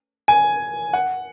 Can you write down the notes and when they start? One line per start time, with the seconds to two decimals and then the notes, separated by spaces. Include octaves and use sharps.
0.28 G#5
0.93 F#5